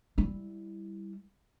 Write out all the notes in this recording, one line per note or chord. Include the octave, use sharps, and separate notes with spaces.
G3 E4